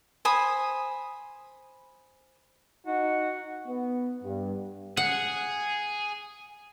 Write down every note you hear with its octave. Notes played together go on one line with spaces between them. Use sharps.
C5 G#5 B5 D#6
D#4 F#4
B3
G2
G#4 F#5